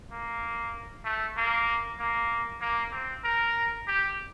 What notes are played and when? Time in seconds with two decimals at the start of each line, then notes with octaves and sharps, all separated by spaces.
0.12 A#3
1.05 A3
1.37 A#3
1.99 A#3
2.61 A#3
2.92 C4
3.24 A#4
3.87 G4